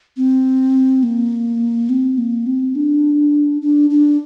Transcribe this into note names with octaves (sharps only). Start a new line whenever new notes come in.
C4
A#3
C4
A#3
C4
D4
D4
D4